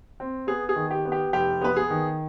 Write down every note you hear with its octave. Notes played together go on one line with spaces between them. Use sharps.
C4
B3 G#4
G#4
D#3
G4
B3
G4
F1 G4
B3 B4
G#4
D#3